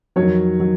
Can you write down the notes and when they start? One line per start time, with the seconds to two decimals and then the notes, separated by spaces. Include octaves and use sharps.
0.16 F2 D#3 F#3 C#5
0.59 D#3 F#3